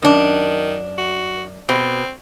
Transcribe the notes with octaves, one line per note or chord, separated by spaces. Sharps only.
F#2 D#3 D4
F#4
B2 C4